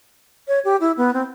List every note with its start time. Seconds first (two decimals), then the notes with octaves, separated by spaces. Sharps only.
0.48 C#5
0.65 G4
0.80 E4
0.97 B3
1.14 C4